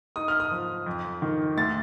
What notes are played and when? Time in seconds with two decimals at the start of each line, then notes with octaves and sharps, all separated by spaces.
0.16 D#4 D#6
0.28 F6
0.40 D#6
0.51 F3
0.86 F2
1.22 D#3
1.57 D2 A6